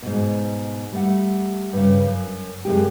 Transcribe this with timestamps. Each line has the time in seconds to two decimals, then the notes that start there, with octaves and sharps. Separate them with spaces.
0.03 G#2 B2
0.92 G3 A3 F#5
1.73 G2 C#3
2.06 F#2
2.65 F#2 C3 G#3 G4